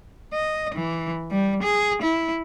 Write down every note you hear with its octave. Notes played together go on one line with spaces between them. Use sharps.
D#5
E3
G3
G#4
E4